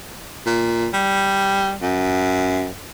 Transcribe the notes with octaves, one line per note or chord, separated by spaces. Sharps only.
A#2
G3
F#2